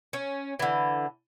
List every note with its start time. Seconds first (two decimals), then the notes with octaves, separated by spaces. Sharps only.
0.13 C#4
0.59 D3 E3